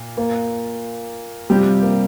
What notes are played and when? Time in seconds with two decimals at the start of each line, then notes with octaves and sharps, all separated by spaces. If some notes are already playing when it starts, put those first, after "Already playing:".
Already playing: A#2
0.17 A#3
1.50 C3 F3 G3 C4 G4
1.83 A#3